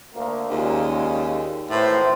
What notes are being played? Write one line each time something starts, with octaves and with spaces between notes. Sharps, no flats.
D2 A#3
D#2 A#2 C#3 G#3
G#1 A2 E3 C5